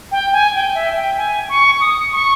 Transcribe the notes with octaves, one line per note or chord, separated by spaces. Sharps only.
G5
G#5
G5
E5
G5
G#5
C#6
D#6
C#6